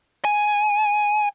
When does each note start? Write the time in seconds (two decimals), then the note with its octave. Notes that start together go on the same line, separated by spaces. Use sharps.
0.25 G#5